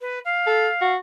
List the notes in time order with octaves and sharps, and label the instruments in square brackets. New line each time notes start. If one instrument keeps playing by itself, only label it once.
[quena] B4
F5
[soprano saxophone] A4
F#4